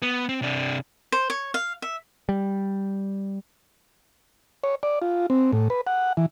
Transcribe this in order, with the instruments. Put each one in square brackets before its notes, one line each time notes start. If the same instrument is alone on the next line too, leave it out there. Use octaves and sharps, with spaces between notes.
[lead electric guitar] B3
C4
C3 D4
[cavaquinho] C5
C#5
F5
E5
[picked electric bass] G3
[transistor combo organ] C#5
D5
F4
C4
A2
B4
F#5
E3